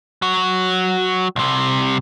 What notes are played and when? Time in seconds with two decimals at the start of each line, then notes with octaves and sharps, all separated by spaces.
0.22 F#3 F#4
1.36 C2 C3